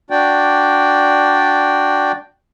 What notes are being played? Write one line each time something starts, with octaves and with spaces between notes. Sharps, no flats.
D4 F#4 D5 G5